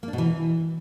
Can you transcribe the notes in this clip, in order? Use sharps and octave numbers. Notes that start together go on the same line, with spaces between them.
A#3
D4
B2
E3